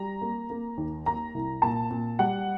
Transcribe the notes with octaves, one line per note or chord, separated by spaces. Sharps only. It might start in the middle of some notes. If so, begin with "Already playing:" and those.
Already playing: G3 A#5
A#3
A#3
D#2
A#3 A#5
C2
A#2 A5
A#2
G3 F#5